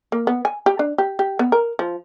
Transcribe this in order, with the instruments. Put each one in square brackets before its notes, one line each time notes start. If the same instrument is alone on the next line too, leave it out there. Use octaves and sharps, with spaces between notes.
[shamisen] A#3
B3
G#5
G4
D4
G4
G4
B3
A#4
F3